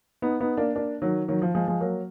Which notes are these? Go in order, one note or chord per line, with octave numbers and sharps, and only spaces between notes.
B3 D#4
B3 D#4
A#3 D4
A#3 D4
D#3 F#3
D#3 F#3
F3
F3 G#3
F3 G#3
F#3 A#3